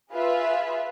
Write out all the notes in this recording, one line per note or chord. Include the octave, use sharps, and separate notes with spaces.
F4 G#4 B4 E5